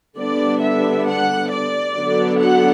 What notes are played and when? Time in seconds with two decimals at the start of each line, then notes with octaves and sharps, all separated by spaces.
0.17 D3 G3 B3 D4 D5
0.62 E5
1.07 F#5
1.51 D5
1.96 D3 F#3 B3 D4
2.40 F#5